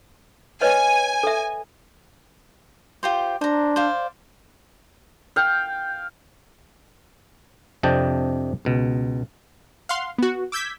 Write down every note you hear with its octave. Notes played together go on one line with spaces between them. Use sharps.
B4 C#5 D#5 G#5
A4 E5
F4 G4 C5
D4 C5 A#5
C5 D5 F5
F5 G5
F2 C3 D4 D#5 G5 A5
C#2 B2
F5 F#5 C6
B3 F#4
D6 E6 G6 G#6 B6